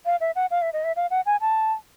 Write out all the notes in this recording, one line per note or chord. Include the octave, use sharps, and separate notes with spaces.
F5
E5
F#5
F5
E5
D#5
E5
F5
F#5
G#5
A5